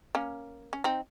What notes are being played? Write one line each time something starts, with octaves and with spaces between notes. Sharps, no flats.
A#3 C#4
C#4
C4 D#4